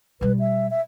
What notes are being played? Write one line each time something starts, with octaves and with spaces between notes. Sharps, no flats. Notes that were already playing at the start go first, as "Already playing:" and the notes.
B2 G3 B4
E5
E5